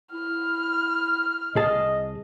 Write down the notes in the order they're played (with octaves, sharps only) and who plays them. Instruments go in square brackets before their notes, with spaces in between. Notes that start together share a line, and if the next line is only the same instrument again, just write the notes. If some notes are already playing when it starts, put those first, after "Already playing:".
[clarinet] E4 [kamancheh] F6
[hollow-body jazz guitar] C2 G#4 A5 [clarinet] D#5